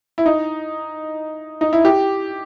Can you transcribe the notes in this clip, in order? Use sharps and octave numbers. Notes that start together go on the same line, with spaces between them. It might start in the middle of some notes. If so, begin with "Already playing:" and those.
E4
D#4
D#4
E4
G4